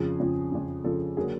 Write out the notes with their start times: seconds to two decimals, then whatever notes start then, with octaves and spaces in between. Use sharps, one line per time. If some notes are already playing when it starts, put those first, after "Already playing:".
Already playing: F2 C#3 F3 G#4
0.20 F2 C#3 F3
0.52 F2 C#3 F3
0.84 F2 C#3 F3 A4
1.17 D3 F#3 A#3 G#4